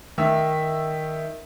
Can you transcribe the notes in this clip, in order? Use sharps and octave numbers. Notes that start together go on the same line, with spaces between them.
D#3 E5